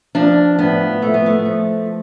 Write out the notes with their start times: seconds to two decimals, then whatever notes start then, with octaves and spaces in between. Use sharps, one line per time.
0.15 F3 D4
0.59 A2 B3
1.02 F3 A3
1.14 B3
1.26 A3
1.45 F3